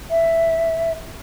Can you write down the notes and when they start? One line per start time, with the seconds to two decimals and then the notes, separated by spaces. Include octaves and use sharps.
0.11 E5